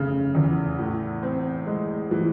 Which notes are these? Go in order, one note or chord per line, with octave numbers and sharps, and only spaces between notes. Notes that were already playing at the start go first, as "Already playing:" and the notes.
Already playing: F1 C#3
E2
A2
C4
G#3
E3